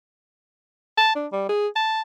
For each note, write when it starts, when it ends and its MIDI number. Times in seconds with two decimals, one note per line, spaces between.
0.97 1.14 81
1.15 1.27 62
1.32 1.46 55
1.49 1.67 68
1.76 2.01 81